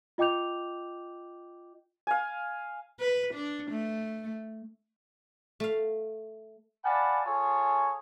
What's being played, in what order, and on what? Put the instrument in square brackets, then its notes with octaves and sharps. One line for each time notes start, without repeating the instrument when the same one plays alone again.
[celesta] F4 D#5 G5 D6 G6 F7
[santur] F5 G#5
[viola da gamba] B4
D4
A3
[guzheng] A3 F5
[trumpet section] D5 F5 F#5 G#5 A5 B5
F4 G#4 A4 C#5 G#5